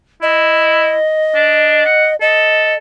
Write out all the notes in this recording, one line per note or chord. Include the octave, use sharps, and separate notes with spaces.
E4 D#5
D4
F#5
A4 D#5